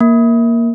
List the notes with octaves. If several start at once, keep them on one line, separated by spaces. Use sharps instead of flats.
A#3